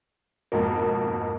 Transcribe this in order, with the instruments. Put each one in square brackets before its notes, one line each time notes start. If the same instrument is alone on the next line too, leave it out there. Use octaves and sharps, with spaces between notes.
[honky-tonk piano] F2 G#2 B2 A#3